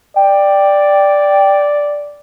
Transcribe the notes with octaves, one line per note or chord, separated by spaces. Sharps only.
D5 G5